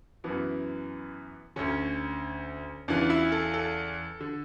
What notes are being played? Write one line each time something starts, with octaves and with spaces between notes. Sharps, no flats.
F#2 E3 B3
D2 D3 C#4
E2 C#3 E3 D4
E4
A4
A4
D3